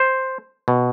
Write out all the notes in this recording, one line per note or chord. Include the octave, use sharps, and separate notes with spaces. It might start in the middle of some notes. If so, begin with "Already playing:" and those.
Already playing: C5
B2